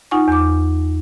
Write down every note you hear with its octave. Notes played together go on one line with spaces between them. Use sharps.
D#4 F4 F#5 G#5 C#6
E2 D6